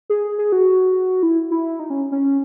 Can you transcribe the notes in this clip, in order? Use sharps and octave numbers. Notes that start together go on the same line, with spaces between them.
G#4
G#4
F#4
E4
E4
D#4
C#4
C#4